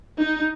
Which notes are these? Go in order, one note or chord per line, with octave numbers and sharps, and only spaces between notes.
D#4